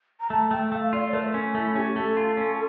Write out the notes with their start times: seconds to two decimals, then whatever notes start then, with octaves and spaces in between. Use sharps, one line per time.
0.20 A#5
0.30 A3 A5
0.51 A3 G5
0.72 A3 F5
0.92 F4 D5
1.08 C#5
1.13 A3 A#4
1.34 C#4
1.55 A3 E4
1.75 C#4 G4
1.95 A3 A4
2.17 F4
2.37 C#4